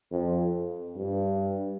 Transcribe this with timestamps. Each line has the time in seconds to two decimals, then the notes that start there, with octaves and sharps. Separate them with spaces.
0.11 F2
0.96 G2